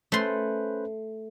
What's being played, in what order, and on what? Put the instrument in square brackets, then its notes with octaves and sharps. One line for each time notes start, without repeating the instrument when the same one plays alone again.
[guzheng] A3 C6 [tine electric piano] C#4 B4 C5